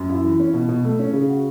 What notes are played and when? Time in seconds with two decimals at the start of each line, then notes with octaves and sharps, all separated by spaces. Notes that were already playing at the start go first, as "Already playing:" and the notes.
Already playing: F#2
0.10 E4
0.24 E3
0.40 C#4
0.54 B2
0.68 B2
0.85 A3
0.99 C#4
1.13 C#3
1.29 F#4